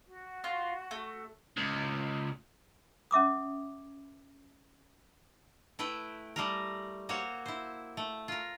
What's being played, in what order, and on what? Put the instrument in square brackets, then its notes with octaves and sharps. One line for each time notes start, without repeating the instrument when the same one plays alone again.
[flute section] F#4
[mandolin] F4
A3
[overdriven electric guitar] C#2
[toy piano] C#4 E5 D6 D#6
[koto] A3 E4 B4 G5
G3 A3 A#4
A#3 C4 F#4 C#5
E4 C5
A3
F4 A#4